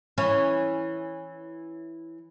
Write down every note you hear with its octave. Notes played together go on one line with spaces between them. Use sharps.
E3 C#4